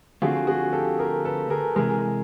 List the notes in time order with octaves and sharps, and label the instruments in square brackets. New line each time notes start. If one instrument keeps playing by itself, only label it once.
[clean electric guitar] D3 F3 A3 C4 F4 [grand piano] F#4 G#4
[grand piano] F#4 G#4
G4 A4
G#4 A#4
A4 B4
G#4 A#4
[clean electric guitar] C3 E3 G#3 [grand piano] G#4 A#4